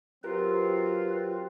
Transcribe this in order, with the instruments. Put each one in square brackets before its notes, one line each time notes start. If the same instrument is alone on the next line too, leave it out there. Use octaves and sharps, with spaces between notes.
[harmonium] F#3 C4 [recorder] F4 [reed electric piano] G4 A#4 [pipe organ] B4